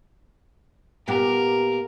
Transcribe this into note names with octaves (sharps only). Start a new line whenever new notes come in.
A#2 B3 G4 A#4